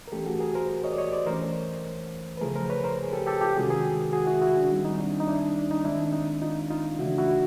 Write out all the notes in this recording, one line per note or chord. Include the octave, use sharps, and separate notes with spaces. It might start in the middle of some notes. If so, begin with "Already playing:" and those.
A#4
E3 A3 C#4 G4 A4
F#4 G#4
G#4 A#4
A#4 C5
C#5 D#5
D5
C#5 D#5
C5 D5
E3 A3 C#4 A#4 C5
B4
C#3 F3 A3 G#4 A#4
A#4 C5
B4 C#5
A#4 C5
G#4
G4 A4
G4 A4
F4 G4
C3 D#3 G#3 C#4 F#4 G#4
G#4 A#4
F#4 G#4
E4 F#4
E4 F#4
D4
D#3 G3 C4 D#4
D#4
D4 E4
D#4
D4 E4
D4
D#4
D#3 G#3 C4 D4 E4
D#4
D#4
D#4 F4
D#4 F4
C#3 E3 A3 D4 E4 F#4
E4 F#4